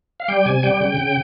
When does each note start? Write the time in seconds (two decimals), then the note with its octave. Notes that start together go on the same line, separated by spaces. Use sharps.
0.20 F5
0.28 G3 G5
0.46 C3 G#5
0.63 G3 G5
0.81 C#3 G5
0.98 C#3